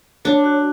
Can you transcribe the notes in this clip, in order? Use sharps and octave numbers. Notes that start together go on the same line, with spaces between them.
D4 C#5
F#4